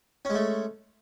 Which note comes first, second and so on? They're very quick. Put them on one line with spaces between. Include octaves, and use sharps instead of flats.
C#4 G#3 A3